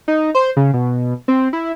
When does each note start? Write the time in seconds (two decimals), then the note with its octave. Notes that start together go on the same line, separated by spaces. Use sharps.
0.08 D#4
0.35 C5
0.57 C#3
0.74 B2
1.28 C4
1.53 E4